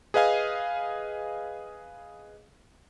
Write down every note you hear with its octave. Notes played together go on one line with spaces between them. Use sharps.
G#4 B4 D#5 F5 G#5